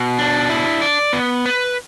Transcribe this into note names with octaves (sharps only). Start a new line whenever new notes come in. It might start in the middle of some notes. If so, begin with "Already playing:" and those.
Already playing: B2
D4
E4
D5
B3
B4